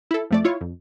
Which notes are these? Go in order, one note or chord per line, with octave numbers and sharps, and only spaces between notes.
E4 A4
F2 A3 D5
E4 F4 C#5
F2